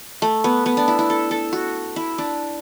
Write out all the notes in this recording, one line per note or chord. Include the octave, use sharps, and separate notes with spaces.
A3
B3
B3
D4
E4
E4
A4
A4
F#4
E4
D4